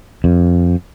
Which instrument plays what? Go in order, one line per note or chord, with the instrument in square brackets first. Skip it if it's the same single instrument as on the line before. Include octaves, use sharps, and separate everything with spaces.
[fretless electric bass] F2